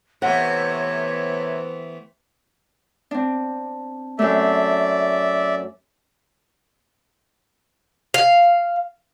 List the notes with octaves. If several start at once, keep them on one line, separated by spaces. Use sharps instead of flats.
C3 E3 A3 B3 C#5 F#5
C4 D4
F#2 A3 D5 E5
F5